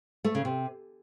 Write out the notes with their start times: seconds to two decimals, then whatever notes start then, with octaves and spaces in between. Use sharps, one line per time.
0.24 A3
0.35 C#3
0.45 C3